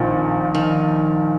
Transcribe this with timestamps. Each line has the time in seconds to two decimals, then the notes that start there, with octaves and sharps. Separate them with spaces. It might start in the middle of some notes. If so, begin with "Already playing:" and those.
Already playing: A#1 A#2 D#3 F3 C4
0.55 D#3